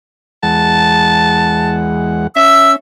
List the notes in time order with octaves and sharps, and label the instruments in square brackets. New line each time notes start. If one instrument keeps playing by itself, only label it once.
[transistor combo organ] E2 G#3 F#5 [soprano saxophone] A5
[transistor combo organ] C#4 [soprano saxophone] E5 [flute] E6